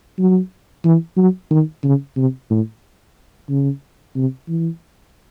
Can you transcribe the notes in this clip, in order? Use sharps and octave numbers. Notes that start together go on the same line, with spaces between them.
F#3
E3
F#3
D#3
C#3
C3
A2
C#3
C3
E3